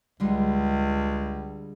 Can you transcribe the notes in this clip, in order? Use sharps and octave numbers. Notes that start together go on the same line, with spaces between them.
C#2 D3 G3 G#3